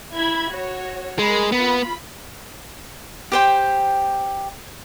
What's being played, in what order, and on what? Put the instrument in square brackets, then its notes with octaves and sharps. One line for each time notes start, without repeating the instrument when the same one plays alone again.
[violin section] E4 B5 G#6
F#4 C#5
[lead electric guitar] G#3 [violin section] A#4 B5
[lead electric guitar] B3 [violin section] F4 B5
[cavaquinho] G4 C5 G5